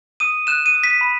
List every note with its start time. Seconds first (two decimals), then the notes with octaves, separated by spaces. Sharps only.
0.20 D#6 D#7
0.47 F#6 E7
0.66 D#7
0.74 D#6
0.83 B6
1.01 B5